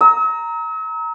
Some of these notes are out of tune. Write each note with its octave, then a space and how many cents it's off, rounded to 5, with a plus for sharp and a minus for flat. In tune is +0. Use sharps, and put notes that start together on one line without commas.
A#5 -5 E6 -45